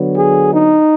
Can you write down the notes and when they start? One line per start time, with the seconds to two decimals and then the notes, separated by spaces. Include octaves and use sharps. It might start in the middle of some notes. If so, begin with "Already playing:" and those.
Already playing: D3 F#3 B3
0.16 G#4
0.51 D#4